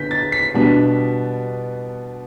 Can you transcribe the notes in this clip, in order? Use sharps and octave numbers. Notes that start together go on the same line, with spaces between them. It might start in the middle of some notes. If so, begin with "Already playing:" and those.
Already playing: D3 B3 G6 B6
A6
B6
B2 G3 B3 D4